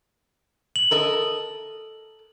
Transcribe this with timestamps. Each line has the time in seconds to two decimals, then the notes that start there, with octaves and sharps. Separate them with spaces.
0.76 F#7
0.91 A4 A#4 D#5